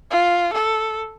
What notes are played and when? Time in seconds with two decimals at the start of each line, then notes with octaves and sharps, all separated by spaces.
0.11 F4
0.54 A4